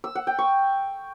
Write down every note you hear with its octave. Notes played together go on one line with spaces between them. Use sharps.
E6
F#5
G5
C#6